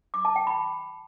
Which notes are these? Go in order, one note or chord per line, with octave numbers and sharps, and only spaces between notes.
D6
A5
G5
B5